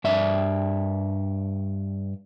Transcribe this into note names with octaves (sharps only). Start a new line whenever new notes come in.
G2 D5 E5